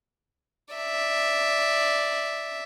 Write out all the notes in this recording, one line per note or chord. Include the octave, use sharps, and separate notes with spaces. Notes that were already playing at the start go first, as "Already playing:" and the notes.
D5 E5